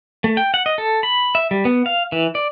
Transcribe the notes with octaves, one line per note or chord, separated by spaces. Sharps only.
A3
G5
F#5
D#5
A4
B5
E5
G3
B3
F5
E3
D5